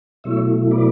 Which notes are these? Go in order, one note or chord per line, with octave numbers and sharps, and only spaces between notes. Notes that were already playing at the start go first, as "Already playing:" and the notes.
B2 F#3 A3 E4 C#5 E5
B4 D5